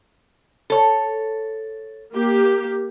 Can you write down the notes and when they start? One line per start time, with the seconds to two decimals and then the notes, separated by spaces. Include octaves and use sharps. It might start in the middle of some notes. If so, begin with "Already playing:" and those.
0.70 A4 C#5
2.12 A#3 G4